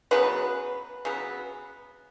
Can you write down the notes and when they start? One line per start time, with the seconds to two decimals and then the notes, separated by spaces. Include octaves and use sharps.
0.11 C#3 F#3 B3 B4
1.05 C#3 F#3 B3